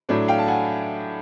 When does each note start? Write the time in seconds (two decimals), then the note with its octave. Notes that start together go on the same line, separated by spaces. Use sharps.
0.09 A2 F#3 A3 D4
0.28 F5 G5
0.39 A5
0.48 F#5 G#5